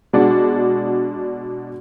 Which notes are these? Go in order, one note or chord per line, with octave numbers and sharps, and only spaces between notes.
B2 G#3 D4 F#4